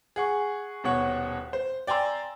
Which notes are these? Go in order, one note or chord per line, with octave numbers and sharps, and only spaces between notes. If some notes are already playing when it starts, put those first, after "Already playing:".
G#4 F#5 C#6
D#1 B2 C#5 F#5
C5
D5 G5 G#5 A#5 C6 E6